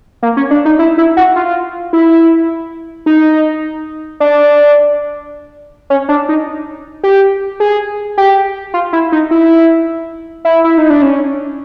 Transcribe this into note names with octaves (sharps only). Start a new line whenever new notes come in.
A#3
C#4
D4
D#4
E4
E4
F#4
F4
E4
D#4
D4
C#4
D4
D#4
G4
G#4
G4
F4
E4
D#4
E4
E4
E4
D#4
D4
C#4